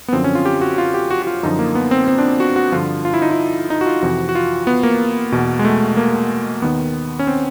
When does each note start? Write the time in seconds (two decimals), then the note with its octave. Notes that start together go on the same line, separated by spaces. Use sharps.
0.08 B3
0.13 F#2 D3 F3 C4
0.24 C#4
0.35 F4
0.45 G4
0.61 F#4
0.78 F4
0.94 G4
1.10 F#4
1.22 F#4
1.27 F4
1.43 F#2 D3 F3 D#4
1.59 A#3
1.75 B3
1.91 C4
2.08 C4
2.18 D4
2.40 F#4
2.56 F#4
2.72 G2 D3 F3 F4
3.05 F4
3.14 E4
3.22 D#4
3.31 E4
3.70 D#4
3.81 F#4
3.87 F4
4.02 F2 C3 E3 F#4
4.29 F#4
4.35 F4
4.67 B3
4.83 A#3
5.32 E2 B2
5.59 G#3
5.65 A3
5.97 A#3
6.62 D#2 D#3 B3
7.19 C#4
7.27 C4